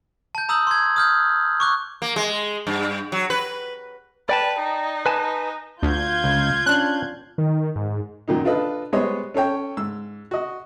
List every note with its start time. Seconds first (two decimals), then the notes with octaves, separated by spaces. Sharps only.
0.35 A5 G6
0.49 A#5 D#6 E6 G6 F#7
0.67 C6 G#6
0.96 D#6 F6 G6
1.60 C#6 D6 F#6
2.02 A#3
2.16 G#3
2.67 G2
3.12 F#3
3.30 B4
4.29 B4 D5 G5 A5
4.60 D#4
5.06 B4 G#5 A5
5.82 D2 F4 G6 G#6
6.24 C#2
6.66 C#4 D4 F#6
7.38 D#3
7.76 G#2
8.28 F#2 A#2 D#3 D#4
8.45 D4 F4 A4 B4 D#5
8.92 G3 G#3 B3 C5 C#5 D#5
9.34 C#4 A4 C#5 G5
9.77 G#2 E6
10.31 F#4 D#5